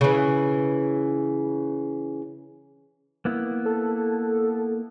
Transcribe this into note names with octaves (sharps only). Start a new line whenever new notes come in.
C#3 E3
A#3 B3 E4
A4